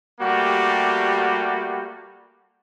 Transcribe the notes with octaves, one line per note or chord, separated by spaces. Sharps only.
G3 A3 A#3 F#4 G4